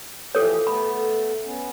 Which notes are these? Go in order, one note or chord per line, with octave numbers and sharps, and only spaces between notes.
E3 F3 G4 A4 C#5
A3 B3 B5
B3 C#4